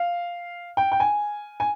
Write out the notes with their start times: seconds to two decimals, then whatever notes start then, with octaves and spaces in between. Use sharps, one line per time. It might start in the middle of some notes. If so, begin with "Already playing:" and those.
Already playing: F5
0.77 G5
0.92 G5
1.00 G#5
1.60 G#5